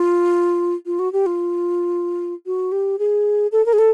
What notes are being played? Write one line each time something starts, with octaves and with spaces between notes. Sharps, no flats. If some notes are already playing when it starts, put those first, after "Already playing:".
Already playing: F4
F4
F#4
G4
F4
F#4
G4
G#4
A4
A#4
G#4
A4